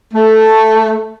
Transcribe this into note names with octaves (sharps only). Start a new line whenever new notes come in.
A3